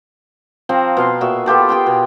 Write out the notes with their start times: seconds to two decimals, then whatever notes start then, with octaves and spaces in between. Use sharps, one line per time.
0.69 F3 C4 F5 A#5
0.97 B2 F5 C6
1.21 A#2 F#4 G#4 E5
1.46 B3 F4 G4 A4
1.69 G4 G#4 G5 C6
1.86 B2